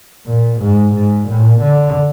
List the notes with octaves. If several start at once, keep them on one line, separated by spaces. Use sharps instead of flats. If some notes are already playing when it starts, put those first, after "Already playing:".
A#2
G#2
G#2
A#2
D3